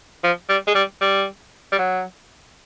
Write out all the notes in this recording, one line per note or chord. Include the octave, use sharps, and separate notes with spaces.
F3
G3
G#3
G3
G3
G3
F#3